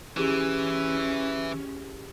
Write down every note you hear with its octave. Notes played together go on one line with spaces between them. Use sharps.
E3 C#4 E4 G4 G#4